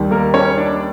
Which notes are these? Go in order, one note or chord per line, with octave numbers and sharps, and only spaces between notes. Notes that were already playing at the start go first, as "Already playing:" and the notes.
Already playing: D#2 D#3 G3
A#3 A#4
C#4 C#5
D4 D5